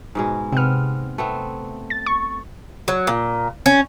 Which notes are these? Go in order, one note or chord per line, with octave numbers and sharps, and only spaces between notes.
G#2 B2 G#3
C3 B3 C4 F6
A3 B3 C4
A6
C#6
F#3
A#2
C#4